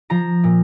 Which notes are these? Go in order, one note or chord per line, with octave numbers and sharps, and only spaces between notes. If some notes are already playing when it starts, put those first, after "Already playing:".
F3 A#5
A#2